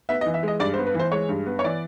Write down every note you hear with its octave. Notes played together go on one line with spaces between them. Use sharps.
B3 E5
D#5
E3
E5
G#3 D#5
G2 D5
C5
B3
B4
E3
C5
G#3 C#5
G2
B3
C#5
E3 D5